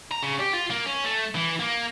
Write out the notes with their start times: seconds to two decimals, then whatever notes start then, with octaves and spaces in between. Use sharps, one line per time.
0.12 A#5
0.23 C#3
0.40 G4
0.54 F4
0.71 A#3
0.87 C#4
1.05 A3
1.35 E3
1.60 A#3